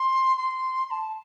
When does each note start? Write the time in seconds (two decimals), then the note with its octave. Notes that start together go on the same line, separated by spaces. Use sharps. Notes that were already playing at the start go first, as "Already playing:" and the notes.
Already playing: C6
0.36 C6
0.86 C6
0.91 A5